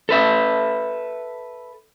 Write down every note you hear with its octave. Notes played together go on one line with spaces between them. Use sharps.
A4 B4 E5